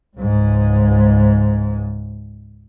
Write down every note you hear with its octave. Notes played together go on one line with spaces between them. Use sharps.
C#2 G#2